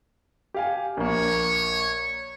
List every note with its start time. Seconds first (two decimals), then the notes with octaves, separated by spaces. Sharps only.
0.54 G4 F5 G#5
0.97 A#1 A#3 C#5